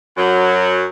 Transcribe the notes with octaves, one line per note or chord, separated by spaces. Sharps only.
F#2 F#3